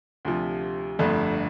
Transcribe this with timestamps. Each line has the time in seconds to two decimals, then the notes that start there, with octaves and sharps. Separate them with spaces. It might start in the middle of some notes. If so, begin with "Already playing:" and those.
0.25 D2 C3 F3
0.99 G1 F2 D3 A3